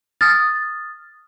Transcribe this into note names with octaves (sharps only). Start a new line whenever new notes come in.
D#6 F6 A6